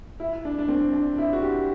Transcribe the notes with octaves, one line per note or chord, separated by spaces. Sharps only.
E4
D4
D4
C4
D4
E4
F#4
G4